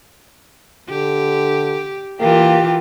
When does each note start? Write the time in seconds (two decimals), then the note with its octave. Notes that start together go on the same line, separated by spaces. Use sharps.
0.89 D3 G4
2.21 E3 A#3 F4 G4